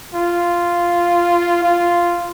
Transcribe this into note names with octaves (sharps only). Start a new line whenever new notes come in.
F4
F4